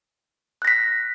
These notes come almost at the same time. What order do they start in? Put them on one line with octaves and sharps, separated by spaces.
F#6 A#6 B6